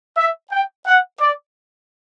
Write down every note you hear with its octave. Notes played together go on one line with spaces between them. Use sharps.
E5
G5
F#5
D5